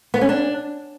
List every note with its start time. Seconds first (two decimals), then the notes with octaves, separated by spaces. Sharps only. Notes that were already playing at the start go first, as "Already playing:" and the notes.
0.14 B3
0.21 C#4
0.29 D4